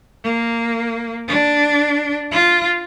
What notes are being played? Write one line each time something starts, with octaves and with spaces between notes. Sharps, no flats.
A#3
D4
F4